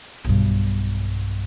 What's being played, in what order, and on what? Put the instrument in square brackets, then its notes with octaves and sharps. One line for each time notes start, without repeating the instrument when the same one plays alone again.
[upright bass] B1 G2